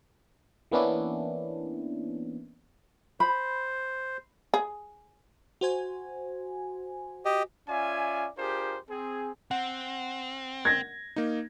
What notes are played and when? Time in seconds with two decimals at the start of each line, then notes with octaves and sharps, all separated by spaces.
0.71 E3 A#3 B3 C#4 D4 E4
3.20 C5 B5
4.54 G#4
5.61 F#4 C5 G#5
7.25 G4 D#5
7.68 C#4 F4 D5 E5 G#5
8.38 D4 F4 G4 G#4 A#4 C5
8.89 C4 G#4
9.51 C4 F#5
10.65 G#6 A#6
11.16 A#3 D#4